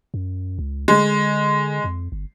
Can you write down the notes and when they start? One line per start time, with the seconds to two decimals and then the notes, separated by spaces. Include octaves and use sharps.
0.14 F#2
0.59 C#2
0.88 D3 G#3
1.84 F2
2.12 G1